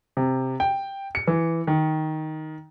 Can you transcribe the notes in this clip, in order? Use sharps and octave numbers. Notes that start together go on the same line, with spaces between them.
C3
G5
C#7
E3
D#3